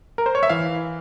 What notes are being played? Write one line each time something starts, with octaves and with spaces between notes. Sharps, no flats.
A#4
C5
C#5
E5
E3 F5